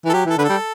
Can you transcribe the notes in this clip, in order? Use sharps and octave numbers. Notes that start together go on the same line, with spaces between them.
E3
A4
F#3 G4
E3
A4
D3 B4
G3 A4